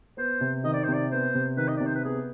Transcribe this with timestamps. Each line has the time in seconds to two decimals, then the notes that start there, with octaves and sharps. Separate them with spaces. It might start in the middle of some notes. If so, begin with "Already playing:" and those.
0.17 B3 C5
0.41 C3
0.64 D#3 D#5
0.73 D5
0.83 C5
0.88 C3 D5
1.11 B3 C5
1.35 C3
1.57 D#3 B4
1.68 D#5
1.77 C3 D5
1.86 C5
1.95 B4
2.04 B3 G#4